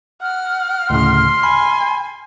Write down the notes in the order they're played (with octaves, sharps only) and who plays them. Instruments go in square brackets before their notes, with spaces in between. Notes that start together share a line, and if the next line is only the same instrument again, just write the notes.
[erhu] F#5 [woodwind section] F6
[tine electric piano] D2 A2 C#3 [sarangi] C6
[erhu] G#5 [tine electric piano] B5